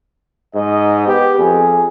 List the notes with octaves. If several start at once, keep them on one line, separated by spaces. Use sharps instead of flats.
G#2 D#5
B3 G4
F2 G#4